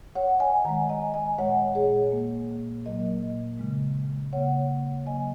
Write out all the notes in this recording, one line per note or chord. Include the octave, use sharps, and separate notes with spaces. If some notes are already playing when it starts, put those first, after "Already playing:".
C#5 F#5
D#5 G#5
D#3 G#3 F#5 A#5
D#5 G#5
D#5 G#5
A#2 G#3 C#5 F#5
G#4 C#5
A#2 A#3
A#2 F#3 A#3 A#4 D#5
C#3 G#3
C#3 A#3 C#5 F#5
C#3 F#3 A#3 D#5 G#5